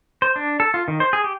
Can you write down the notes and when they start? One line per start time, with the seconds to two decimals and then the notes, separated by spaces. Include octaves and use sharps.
0.22 C5
0.36 D4
0.60 A4
0.74 F4
0.88 D#3
1.00 C5
1.13 G#4
1.24 G4